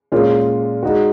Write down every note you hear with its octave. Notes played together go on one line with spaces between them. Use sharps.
A#2 G#3 C#4 F4 A#4
G#3 D#4 F#4